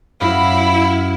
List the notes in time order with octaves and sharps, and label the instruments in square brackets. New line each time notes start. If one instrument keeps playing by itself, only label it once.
[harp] F#2 [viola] E4 [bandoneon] F5 B5